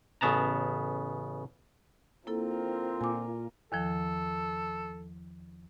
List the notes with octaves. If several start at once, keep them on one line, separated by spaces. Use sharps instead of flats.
A1 C#3 B3 A5 A#5
D3 A#3 C4 E4 F4 A4 A#4
A#2 G#5 D6
E2 D#3 F3 A4